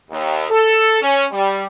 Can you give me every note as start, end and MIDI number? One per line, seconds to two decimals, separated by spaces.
0.10 0.46 39
0.50 1.01 69
1.02 1.25 61
1.31 1.65 55